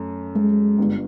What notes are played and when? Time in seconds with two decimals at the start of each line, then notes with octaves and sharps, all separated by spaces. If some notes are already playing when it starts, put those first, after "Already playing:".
Already playing: F#2 A3
0.36 G#3
0.78 G1 G2 D3